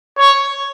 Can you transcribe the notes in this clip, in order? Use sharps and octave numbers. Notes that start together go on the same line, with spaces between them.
C#5